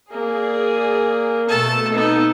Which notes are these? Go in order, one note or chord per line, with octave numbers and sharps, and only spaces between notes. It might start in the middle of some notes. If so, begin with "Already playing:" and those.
A#3 G#4 D5
B2 A3 A4 A5
B3 D#4 A4